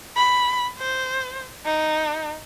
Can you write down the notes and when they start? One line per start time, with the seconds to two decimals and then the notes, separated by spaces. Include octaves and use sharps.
0.16 B5
0.78 C5
1.65 D#4